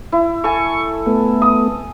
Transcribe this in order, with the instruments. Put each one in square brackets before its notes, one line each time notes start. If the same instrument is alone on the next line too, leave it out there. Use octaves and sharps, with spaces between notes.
[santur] E4
[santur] A4 G#5 [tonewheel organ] C#6
[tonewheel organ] A3 B3
[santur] D#6